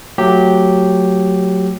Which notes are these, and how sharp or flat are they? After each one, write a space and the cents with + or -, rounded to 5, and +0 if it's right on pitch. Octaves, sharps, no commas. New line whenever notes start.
F#3 -10 A3 +20 G4 -5